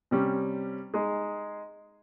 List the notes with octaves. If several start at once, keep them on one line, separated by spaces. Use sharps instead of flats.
C3 G3 C#4
G#3 D#4 G#4